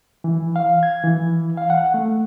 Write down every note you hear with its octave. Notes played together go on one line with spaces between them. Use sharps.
E3
F5
G#6
E3
F5
F#5
A3